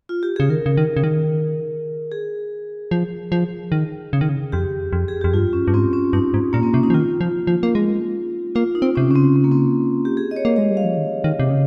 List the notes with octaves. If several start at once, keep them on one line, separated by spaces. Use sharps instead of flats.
F4
G4
C#3 G#4
D#3 A#4
C#3
D#3
C#3
D#3
G#4
F3
F3
D#3
C#3
D#3
C#3
F2 G4
F2
G#4
F2 G4
G2 F4
C#4
G2
G#2 C4
C#4
G2 D#4
G#2
A#2 A#3
C4
C3 C#4
D#4
F3
D#3 F4
F3
F3
A#3
G#3
A#3 F4
D#4
C4
C3 C#4
C#3 C#4
C4
C4
A#3
C4
G4
G#4
D#5
C#5
A#3
G#3 D#5
G3
F5
F3
D#3
D#3
C3
C#3